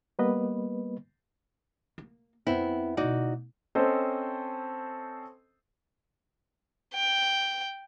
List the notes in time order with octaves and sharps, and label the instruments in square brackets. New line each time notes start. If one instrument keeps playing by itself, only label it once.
[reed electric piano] G3 A#3 B3 B4 D#5
[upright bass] A#3
[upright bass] F2 [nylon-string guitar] B3 C4 E4
[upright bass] D2 B2 [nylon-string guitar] D#4 F#4 D5
[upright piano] C4 C#4 A4 C5 D#5
[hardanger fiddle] G5